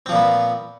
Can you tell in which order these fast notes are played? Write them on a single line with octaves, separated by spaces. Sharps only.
C4 F3 A#2 B3